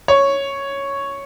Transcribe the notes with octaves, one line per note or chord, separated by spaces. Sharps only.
C#5